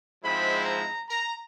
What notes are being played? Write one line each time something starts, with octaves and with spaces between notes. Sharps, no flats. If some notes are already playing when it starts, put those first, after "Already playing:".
G#2 F3 G#3 C4 E4 B5
A#5
A#5